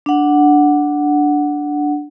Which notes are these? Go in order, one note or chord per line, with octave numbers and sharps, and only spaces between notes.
D4 F#5